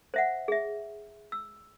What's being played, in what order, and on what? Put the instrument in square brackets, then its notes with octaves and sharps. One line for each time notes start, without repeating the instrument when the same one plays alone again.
[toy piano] C5 E5 F#5
G#4 E5
E6